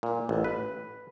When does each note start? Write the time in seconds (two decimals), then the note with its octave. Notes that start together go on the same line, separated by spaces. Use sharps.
0.03 A#2
0.29 A1
0.44 B4